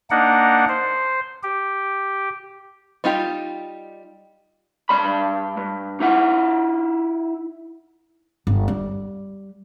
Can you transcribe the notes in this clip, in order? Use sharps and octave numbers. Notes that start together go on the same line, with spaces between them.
A#3 D4 D#4 F#5
C5
G4
G3 D#4 F4 G4
G2 F#3 D5 B5
G2
D#4 E4 F#5
G1
G3